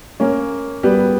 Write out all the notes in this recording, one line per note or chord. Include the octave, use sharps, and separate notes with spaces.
A#3 C#4
G3 B3